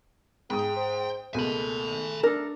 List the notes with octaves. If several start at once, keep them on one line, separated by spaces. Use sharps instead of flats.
G#2 G#4 G5 D#6
C5
C#2 B2 A3 A#3 G#5 B5
D4 A4 A#4